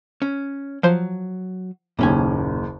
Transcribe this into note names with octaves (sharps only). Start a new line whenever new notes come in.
C#4
F3 F#3 C5
F#1 D#2 A#2 C#4 G#5